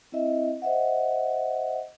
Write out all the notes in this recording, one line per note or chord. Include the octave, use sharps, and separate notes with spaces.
C4 E4 D#5 E5
C5 D#5 E5 F#5